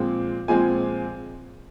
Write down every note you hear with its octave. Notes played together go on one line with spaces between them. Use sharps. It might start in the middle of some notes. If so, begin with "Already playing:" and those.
Already playing: A#2 F3 G#3 C4
A#2 F3 G#3 C4 G#5